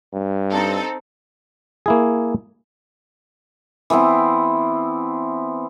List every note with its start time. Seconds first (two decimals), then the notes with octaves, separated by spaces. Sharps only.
0.14 G2
0.52 C4 D#4 A4
1.86 A#3 E4 G#4
3.90 E3 B3 C4 E4